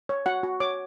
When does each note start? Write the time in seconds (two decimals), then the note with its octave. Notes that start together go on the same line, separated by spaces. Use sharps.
0.09 C#5
0.26 F#4 F#5
0.43 F#4
0.60 C#5 D6